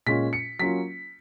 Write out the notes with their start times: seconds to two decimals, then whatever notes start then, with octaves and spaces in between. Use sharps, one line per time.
0.06 A#2 G#3 C#4 F4 B6
0.33 C#7
0.59 F#3 A#3 C#4 F4 B6